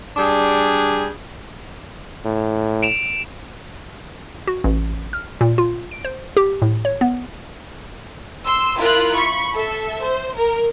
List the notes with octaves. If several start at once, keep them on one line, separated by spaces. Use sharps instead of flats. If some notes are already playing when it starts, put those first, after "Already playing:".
G3 D4 G#4
A2
D7 E7 F7
F#4
A1
F6
A#2
F4
D7
C5
G4
A2
C#5
B3
C6 E6
E4 F4 A#4 F#6
B5 C#6
A4 E5
C5
A#4